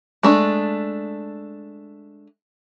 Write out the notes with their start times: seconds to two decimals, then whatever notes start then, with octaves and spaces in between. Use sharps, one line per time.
0.23 G#3 A3 D4